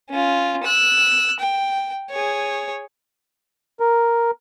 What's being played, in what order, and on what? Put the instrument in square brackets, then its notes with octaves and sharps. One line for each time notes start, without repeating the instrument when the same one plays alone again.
[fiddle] C#4 F4
E6 F#6
G5
G#4 C#5
[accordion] A#4